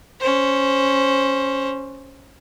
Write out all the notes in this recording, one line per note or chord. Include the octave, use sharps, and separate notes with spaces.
C#4 C5